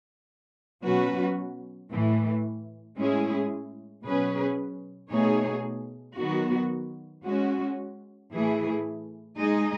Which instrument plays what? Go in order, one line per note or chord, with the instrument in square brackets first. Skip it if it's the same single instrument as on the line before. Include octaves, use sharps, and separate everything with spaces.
[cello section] B2 F#3 C#4 F#4 B4
A2 E3 A3
A2 G#3 C#4 E4 G#4
B2 F#3 C#4 G#4 B4
B2 A3 D#4 G#4 C#5
D#3 F#3 B3 F#4
G#3 C#4 F#4
A2 E3 A3 E4 G#4
G#3 D#4 G#4 D#5